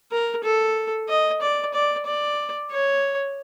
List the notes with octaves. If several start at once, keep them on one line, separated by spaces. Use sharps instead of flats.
A#4
A4
D#5
D5
D5
D5
C#5